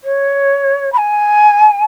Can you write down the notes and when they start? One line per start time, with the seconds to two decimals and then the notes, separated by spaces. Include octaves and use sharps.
0.03 C#5
0.92 B5
0.97 G#5